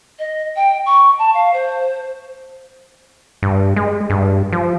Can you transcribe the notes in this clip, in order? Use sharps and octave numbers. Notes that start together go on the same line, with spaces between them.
D#5
G5
C#6
A5
F5
C5
G2
G#3
G2
F3